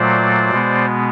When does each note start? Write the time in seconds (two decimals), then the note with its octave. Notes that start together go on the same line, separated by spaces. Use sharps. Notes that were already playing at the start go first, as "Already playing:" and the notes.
Already playing: A#2 F#3 A3 C5 D5
0.50 B2 G#3 B3